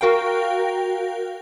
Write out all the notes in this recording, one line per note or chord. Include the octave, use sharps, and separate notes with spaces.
F#4 A#4 F5 G5